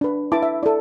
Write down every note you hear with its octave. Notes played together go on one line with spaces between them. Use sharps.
D4 B4
E4 B4 A5 D6
E5
E4 A4 D5